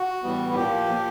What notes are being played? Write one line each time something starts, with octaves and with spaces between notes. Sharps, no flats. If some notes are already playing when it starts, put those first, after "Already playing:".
Already playing: F#4
A2 E3 G3 B3
A#2 F3 A#3 G4
A#2 F3 A#3